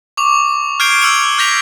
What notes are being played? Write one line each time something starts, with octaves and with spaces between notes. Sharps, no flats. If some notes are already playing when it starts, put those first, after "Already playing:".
C#6 D6 F7
F6 G6 G#6 C7 D7 G7
E6 F6 C#7 F7
F6 G6 G#6 A#6 B6 F7